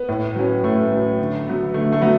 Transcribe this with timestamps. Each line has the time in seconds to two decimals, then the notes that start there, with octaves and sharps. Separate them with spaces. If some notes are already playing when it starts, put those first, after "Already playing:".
Already playing: B3
0.09 A2
0.36 F#3 C#4
0.64 A2 A3
0.91 F#3 C#4
1.19 D3
1.47 F#3 B3
1.74 D3 A3
1.93 A3
2.01 F#3 B3